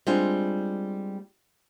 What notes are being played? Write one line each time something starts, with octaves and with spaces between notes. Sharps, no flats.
G3 G#3 C4 D4 F4